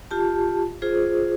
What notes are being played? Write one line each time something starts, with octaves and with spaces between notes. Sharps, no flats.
F4 G4 A5
F4 G#4 C5